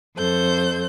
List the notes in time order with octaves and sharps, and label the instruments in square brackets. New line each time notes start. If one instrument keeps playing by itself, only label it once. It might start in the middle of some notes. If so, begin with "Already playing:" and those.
[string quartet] F2 A4 C5 G6